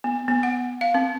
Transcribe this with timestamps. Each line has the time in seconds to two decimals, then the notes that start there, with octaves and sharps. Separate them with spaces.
0.04 B3
0.28 B3
0.43 F#5
0.81 F5
0.94 C4